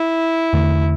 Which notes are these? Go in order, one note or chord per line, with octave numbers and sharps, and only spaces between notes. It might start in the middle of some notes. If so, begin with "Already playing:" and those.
Already playing: E4
E2 D3 A3